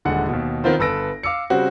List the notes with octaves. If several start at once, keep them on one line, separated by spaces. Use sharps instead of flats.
D#1 D3 G#3 F#5 C#7
D#2 B2
D#3 B3 C4 F4 A#4 C5
G1 A4 B4 E6 A#6 D7
F5 D6 E6 C#7
C#3 G3 C4 F#4